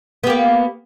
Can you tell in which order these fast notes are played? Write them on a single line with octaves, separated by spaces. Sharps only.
B3 G4 A#3